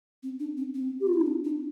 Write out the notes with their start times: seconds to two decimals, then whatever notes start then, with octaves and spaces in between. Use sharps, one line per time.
0.23 C4
0.40 D4
0.57 C4
0.75 C4
1.00 G4
1.07 F4
1.14 E4
1.21 D4
1.27 C4
1.44 D4